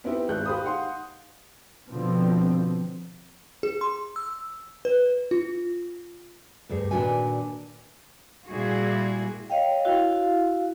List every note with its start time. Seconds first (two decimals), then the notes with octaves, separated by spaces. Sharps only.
0.04 B3 C4 D#4 E4 G4
0.29 G#1 G#3 G#4 F#6 G6
0.45 G4 G#4 C5 F5 B5 D#6
0.64 D#4 F5 F#5 C6
1.91 B2 D3 F3 C4
3.63 G#4
3.81 C6
4.16 E6
4.85 B4
5.31 F4
6.69 D2 G2 G#4
6.91 A#2 D#3 D4 F#4 B4 G#5
8.51 A#2 G3 E4 F#4 G#4
9.50 C#5 D#5 F5 G5
9.85 E4 F#4 F5